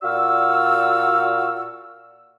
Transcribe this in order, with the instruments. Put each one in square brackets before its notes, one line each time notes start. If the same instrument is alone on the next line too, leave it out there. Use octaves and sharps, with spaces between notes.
[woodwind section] A#2 F#4 D5 F5 E6